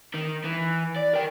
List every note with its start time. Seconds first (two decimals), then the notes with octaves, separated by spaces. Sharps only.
0.14 D#3
0.45 E3
0.96 D5
1.13 A#4 G5